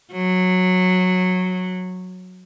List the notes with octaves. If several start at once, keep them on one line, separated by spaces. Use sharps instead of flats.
F#3